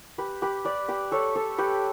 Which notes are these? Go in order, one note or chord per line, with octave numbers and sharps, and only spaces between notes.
G4 B4
G4 B4
B4 D5
G4 B4
A4 C#5
A4 C#5
G4 B4